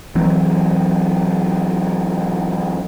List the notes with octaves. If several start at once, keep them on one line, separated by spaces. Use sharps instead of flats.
E3 F#3 C4